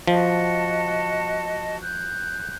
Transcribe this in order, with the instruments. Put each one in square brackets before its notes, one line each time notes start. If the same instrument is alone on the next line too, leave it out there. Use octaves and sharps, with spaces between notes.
[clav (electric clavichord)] F3 [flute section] F#4 D#5 A5
[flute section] F#6 G6